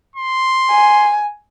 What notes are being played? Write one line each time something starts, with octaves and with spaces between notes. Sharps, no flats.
C6
G#5